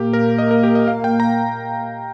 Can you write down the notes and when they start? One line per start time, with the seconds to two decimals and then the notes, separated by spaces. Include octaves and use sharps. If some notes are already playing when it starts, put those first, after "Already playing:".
Already playing: A#2 A#3 G4
0.13 A#4
0.38 D#5
0.51 A#4
0.63 G4
0.75 D#5
0.88 F5
1.04 G5
1.20 A#5